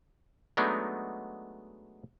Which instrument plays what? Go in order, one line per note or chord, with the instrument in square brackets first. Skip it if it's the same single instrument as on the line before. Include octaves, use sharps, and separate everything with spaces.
[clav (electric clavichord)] F#3 G#3 A3 B3 D4 D#4